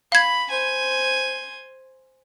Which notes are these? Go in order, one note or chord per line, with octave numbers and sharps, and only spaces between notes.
F5 B5 G#6
C5 G#5